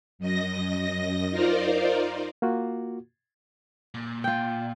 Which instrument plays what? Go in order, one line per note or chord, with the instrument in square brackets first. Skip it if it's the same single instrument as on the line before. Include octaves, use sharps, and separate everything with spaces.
[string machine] F#2 D#5 A#6
D#4 F4 A#4 C5 D5
[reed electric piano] A#3 F4 F#4
[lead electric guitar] A#2
[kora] F4 G5